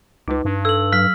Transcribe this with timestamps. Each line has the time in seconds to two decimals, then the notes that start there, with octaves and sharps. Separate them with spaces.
0.28 C#2 D#4 B4
0.45 G2
0.65 A4 E6 F#7
0.92 F#3 F6 B6